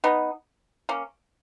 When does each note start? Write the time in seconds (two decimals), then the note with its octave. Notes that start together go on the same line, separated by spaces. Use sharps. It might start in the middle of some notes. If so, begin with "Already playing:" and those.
0.04 B3 D#4
0.89 A#3 C#4